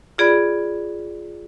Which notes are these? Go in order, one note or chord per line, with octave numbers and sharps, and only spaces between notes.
F4 G#4 D5 B5